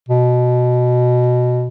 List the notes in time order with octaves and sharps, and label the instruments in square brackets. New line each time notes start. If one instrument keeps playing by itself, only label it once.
[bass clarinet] B2